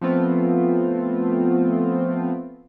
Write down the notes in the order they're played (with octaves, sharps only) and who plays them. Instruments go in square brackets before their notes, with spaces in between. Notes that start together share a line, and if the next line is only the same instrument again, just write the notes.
[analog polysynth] F3 A3 B3 C4 F4